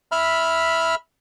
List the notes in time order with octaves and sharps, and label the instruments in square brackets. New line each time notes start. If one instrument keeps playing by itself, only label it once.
[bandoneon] E5 B5 F6